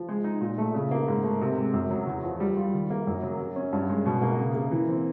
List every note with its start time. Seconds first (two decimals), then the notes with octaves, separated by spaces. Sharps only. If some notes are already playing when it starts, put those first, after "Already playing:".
Already playing: F3
0.09 G#3
0.24 D#4
0.41 A#2
0.58 A3
0.74 C#3
0.91 A#3
1.08 G#2
1.24 A3
1.41 C3
1.57 G#3
1.74 F#2
1.91 F#3
2.07 E2
2.24 F3
2.40 G3
2.57 F4
2.73 D#3
2.90 A#3
3.07 F#2
3.23 F#3
3.40 F#3
3.56 C#4
3.73 G2
3.89 G#3
4.06 B2
4.22 A#3
4.39 C#3
4.55 A#3
4.71 E3
4.89 C4